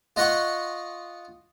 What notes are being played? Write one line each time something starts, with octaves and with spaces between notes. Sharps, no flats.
F4 D#5 F#5 C6 C#6